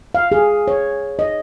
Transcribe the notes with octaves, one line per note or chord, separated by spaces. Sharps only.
F5
G#4
C#5
D#5